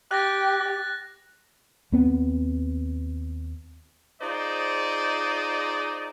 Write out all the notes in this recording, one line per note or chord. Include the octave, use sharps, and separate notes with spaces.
G4 F#6 A6 A#6
D#2 B3 C4
D#4 F4 G#4 C5 D5 D#5